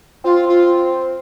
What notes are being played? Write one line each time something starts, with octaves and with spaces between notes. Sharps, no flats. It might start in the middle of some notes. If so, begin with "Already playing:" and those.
C4 F4
F4